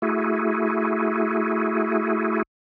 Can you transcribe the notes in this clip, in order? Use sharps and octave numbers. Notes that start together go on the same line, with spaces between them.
A3 E4 F#4 G#4